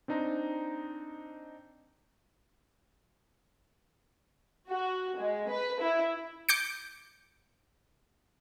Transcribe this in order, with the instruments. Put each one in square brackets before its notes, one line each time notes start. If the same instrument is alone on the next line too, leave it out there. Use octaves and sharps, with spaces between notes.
[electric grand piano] C4 D4 D#4 C5 A#5 C6
[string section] F#4
G#3
B4
E4
[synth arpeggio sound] D6 G6 C#7